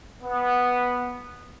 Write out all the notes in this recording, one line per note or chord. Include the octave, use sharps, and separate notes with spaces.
B3